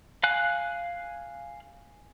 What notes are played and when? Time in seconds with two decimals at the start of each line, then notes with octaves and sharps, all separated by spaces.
0.23 F5 G#5 F#6